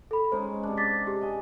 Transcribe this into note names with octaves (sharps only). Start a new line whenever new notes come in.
A4 B5
G#3 C#4 D#4 C5
C3 D4
D6 A6 B6
G4 G#4
D#5 G#5